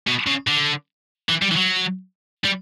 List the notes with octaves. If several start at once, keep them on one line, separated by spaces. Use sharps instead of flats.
B2
C#3
D3
E3
G3
E3
F#3
G3